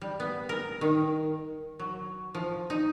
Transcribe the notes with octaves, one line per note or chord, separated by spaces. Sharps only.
G3
B3
A#4
D#3
F#3
F3
D#4